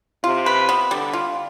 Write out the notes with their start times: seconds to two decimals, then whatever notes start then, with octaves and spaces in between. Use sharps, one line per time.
0.24 C3 F4
0.46 B4
0.69 B3
0.91 D3 G3
1.13 F4